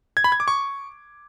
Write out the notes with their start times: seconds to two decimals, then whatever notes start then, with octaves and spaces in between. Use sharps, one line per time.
0.17 G#6
0.24 B5
0.32 G#6
0.40 D6
0.48 C#6